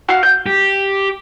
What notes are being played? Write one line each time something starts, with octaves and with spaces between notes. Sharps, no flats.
F#4 F5
G6
G4